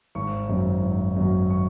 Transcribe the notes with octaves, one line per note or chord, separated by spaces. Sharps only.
G#1 C#6
F#2 F#3
G#1
F#2 F#3
C#6